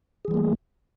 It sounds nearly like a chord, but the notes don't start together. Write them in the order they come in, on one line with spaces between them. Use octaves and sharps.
G#4 E3 G3 A#3 A3